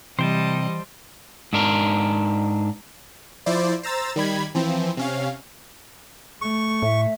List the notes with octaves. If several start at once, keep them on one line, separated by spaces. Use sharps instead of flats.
C3 E3 G3 C5 D#5 G5 A5
G#2 D4 A#4
F3 E4 C5 D5
C5 A#5 E6 A6
D#3 G3 B5 G#6
E3 F3 C4
C3 C#4 F5
A3 C#6
A2 E5